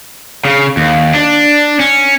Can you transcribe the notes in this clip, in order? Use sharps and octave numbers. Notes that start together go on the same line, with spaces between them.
C#3
D#2
D4
C#4